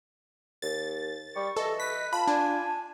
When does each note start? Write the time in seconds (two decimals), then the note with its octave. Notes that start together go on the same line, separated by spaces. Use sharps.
0.62 D#2 A6
1.36 G3 C#6
1.56 E3 A4 D#5
1.80 B4 B6
2.13 F4 A5 B5
2.28 D4 G#5